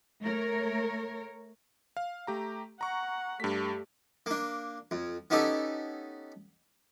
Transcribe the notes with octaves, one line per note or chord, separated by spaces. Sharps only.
A3 A#4 C#5
F5
A3 G4 A#5
F#5 A#5 C#6
G2 A3 G4 B6
A#3 D4
F2
B3 C#4 D#4 G4 A4